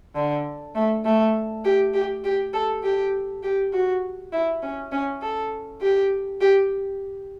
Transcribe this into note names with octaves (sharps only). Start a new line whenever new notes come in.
D3
A3
A3
G4
G4
G4
A4
G4
G4
F#4
E4
C#4
C#4
A4
G4
G4